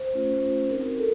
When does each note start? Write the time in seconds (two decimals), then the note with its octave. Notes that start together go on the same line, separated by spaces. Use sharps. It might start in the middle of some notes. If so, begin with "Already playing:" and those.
Already playing: C5
0.14 A3 C#4 F4
0.70 C4 D#4 F#4 A#4
0.99 A4